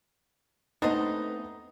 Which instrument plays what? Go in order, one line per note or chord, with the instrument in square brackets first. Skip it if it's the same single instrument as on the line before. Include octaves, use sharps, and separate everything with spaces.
[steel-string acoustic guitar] A3 B3 C4 [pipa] D4 C5 D#5 [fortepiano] D#4 A#5